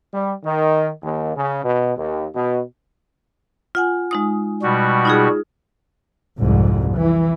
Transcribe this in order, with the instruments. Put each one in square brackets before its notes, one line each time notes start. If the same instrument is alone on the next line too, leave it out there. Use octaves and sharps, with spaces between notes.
[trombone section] G3
D#3
D#2
C#3
B2
D#2
B2
[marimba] F4 F#5 G#5
G#3 D#4 D#6
[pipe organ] B2 G3 F#4
[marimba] D#4 F4 G#4
[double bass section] C2 F2 G#2
E3